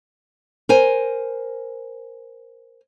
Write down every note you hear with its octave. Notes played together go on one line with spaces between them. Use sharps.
A#4 C5 G#5